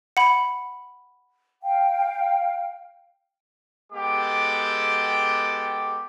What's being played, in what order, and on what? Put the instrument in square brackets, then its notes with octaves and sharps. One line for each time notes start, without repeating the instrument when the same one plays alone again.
[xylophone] F#5 B5
[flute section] F5 G5
[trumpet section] G#3 B3 G4 A4 G5 D6